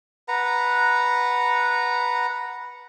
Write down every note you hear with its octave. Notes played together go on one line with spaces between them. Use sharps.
B4 F#5 A#5